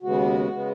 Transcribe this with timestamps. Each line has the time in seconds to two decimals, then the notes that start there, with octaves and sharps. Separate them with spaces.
0.02 D#2 C#3 G#3 B3 F#4
0.52 C#3 G#3 B3